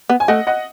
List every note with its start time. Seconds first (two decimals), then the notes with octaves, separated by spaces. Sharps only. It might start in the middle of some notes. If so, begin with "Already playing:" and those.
0.10 B3
0.20 G#5
0.28 A3 D#5 F#5
0.47 D#5 F#5